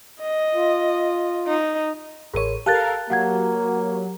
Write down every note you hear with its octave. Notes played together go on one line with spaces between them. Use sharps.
D#5
F4
D#4
A1 G#4 A#4 C#5 D#7
G4 A4 A#4 F5 A5 F#6 A6
F#3 A#3 F5 F#5 G#6